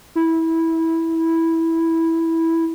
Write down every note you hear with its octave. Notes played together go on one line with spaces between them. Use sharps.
E4